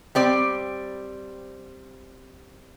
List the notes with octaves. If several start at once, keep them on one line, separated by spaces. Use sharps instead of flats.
G3 C4 D5